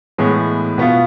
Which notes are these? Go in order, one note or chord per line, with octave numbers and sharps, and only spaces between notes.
A2 E3 G#3 B3
B2 B3 F4